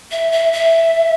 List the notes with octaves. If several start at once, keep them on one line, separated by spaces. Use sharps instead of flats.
E5
E5
E5